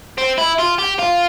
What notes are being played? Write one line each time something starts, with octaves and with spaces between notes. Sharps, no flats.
C4
E4
F4
G4
F4